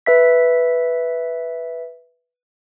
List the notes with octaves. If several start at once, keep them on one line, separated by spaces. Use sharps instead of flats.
B4 E5 B6